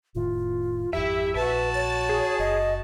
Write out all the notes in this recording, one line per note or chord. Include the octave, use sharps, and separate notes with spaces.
F1 A2 D#3 F4
G#1 F2 E4 G4 E5
A#1 F#4 B4 A5
C#5 A6
G#4
F#1 D#5